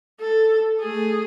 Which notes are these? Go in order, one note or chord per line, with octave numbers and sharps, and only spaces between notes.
A4
A3 G#4